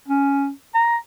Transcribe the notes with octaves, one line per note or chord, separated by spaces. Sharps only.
C#4
A#5